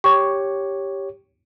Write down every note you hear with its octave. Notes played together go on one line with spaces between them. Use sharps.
G4 C#5 C#6